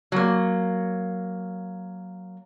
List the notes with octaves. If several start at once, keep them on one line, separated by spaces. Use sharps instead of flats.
F#3 A#3